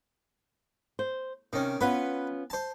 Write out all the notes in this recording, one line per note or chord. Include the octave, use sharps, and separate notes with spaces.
C5
C3 D#3 C#4
B3 C#4 F4 B4 F#5
C5 A5